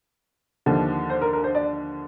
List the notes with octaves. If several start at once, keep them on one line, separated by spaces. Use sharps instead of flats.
D#2 D3 F3
C5
A#4
A#4
C5
D5